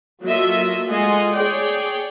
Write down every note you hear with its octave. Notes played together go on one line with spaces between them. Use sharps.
F#3 A#3 F4 A4 D#5 E5
G#3 A3 F4 D#5 F#5 G#5
G#4 C#5 D5 G5